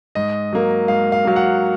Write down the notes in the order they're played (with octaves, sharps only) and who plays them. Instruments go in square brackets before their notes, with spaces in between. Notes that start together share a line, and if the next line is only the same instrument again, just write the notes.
[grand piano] G#2 D#5
F#3 A#3
G#2 F5
F5
F#3 A#3 F5
F#5